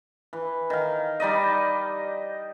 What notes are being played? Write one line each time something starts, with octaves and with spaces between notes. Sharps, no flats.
E3
D#3 F5
G3 D#4 D5 D#5